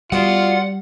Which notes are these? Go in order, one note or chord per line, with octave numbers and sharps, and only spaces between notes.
G3 B3 F4 F#4 D5 F#5